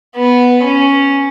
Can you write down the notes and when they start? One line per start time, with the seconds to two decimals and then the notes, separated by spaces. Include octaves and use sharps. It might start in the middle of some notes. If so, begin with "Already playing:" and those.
0.16 B3
0.63 C#4